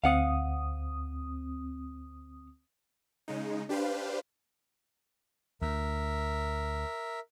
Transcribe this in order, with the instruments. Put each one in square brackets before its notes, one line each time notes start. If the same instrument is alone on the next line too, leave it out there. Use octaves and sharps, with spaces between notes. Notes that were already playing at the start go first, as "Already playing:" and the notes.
[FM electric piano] D2 C4 D#6 [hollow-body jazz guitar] F5 F#5
[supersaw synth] C#3 G#3 D#4
D4 G4 B4 C5 F5
[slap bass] D2 [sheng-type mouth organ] A#4 E5